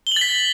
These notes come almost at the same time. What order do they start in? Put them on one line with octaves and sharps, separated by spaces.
G7 F#7 A6 B6